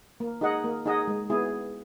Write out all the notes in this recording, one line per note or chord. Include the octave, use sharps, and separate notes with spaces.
A#3
D#4 G#4 D#5 F#5
A#3
D#4 G#4 D#5 F#5
G#3
B3 E4 G#4